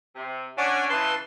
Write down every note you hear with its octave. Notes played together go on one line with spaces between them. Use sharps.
C3
C#4 D4 C#5 F#5 G#5
C#3 E3 B4 A5 C6